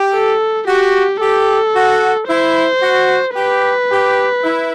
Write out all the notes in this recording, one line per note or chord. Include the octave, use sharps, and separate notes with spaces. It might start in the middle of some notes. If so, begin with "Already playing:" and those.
Already playing: G4
A4
F#4 G4
G4 A4
F#4
E4 C5
F#4
G4 B4
G4
E4